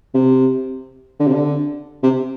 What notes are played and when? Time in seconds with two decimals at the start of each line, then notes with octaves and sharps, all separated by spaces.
0.14 C3
1.19 D3
1.27 C3
1.34 D3
2.03 C3